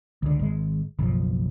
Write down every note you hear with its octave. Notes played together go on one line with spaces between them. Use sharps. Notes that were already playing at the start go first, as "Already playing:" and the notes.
C#2 D3
G#1 G#3
F#1 B1 F3